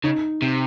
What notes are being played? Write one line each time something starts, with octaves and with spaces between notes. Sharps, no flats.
C#3 D#4
C3